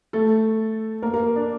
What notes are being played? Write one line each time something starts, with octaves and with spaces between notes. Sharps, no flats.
A3 A4
A#3 A#4
A#3 A#4
D4 D5